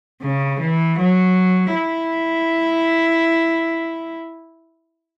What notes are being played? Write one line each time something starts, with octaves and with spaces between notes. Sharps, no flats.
C#3
E3
F#3
E4